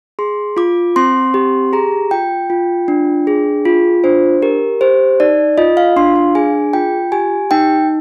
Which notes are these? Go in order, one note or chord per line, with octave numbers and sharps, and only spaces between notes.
G#4 C6
F4 D6
C4 C6
G4
G#4 A#5
F4 G5
F4
D4
G#4
F4
D4 C5
G4 A#4
G4 C5
D#4 D5
F4 D#5
F5
D4 C6
F5
G#4 G#5
F4 G5
G4 G#5
D#4 G5